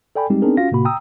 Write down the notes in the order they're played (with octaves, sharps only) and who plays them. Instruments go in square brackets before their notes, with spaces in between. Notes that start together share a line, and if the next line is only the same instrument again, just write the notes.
[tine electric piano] A4 D5 G5 G#5 B5
G3 G#3 C4 D#4 G4
B3 C4 D4 D#4 G#4 A#4
C#4 F4 F#4 F5 A#6
A2 C3 A#3 F#4 B5
G5 A#5 D#6 E6